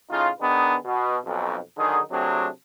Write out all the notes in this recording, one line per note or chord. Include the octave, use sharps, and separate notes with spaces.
A2 C#3 D#4 F4
D#3 B3 D4 D#4 G#4 B4
B2
B1 F2
D3 D#3 F#3 D#4 G#4
C3 F#3 A3 C4 D4 G#4